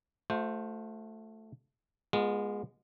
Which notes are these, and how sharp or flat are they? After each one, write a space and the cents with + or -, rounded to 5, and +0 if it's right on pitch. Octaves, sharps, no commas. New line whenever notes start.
A3 +0 F#4 -45 C5 +0
G#3 -10 B3 -35 F4 +20